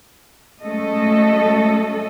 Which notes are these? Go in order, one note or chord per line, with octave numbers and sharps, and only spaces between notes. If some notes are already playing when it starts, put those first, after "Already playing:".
F#3 G#3 A3 C#4 A4 D#5